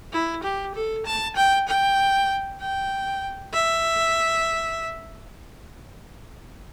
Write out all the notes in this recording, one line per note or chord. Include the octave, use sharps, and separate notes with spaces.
E4
G4
A4
A5
G5
G5
G5
E5